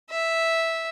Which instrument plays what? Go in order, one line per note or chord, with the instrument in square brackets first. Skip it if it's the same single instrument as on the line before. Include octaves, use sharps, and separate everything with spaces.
[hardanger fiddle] E5